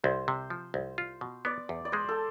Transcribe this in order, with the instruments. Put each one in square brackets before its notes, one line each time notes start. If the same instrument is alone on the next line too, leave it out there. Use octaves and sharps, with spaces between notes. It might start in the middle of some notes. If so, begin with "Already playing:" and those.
[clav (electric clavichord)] C2 [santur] C5
[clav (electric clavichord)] C3
F3
C2
F4
B2
[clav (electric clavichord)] B3 [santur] D5
[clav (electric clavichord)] E2
[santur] D5
[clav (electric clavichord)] G#3 [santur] C5
[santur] A4